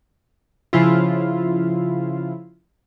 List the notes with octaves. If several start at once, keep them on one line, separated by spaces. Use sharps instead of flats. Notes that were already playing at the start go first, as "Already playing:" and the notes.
C#3 F3 E4 F4